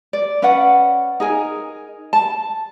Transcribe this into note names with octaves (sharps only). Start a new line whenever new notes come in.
D5
C#4 B4 D5 F#5
D#4 G#4 A#4 G#5
A5